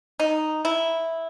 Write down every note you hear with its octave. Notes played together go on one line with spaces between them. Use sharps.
D#4
E4